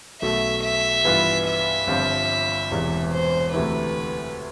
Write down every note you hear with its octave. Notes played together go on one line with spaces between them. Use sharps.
B1 B2 A3 E5
E5
G2 E3 B3 F4 B4
E5
G1 G2 F3 C4 F4
E1 E2 C3 E3
C5
D2 C3 E3 A3 E4 B4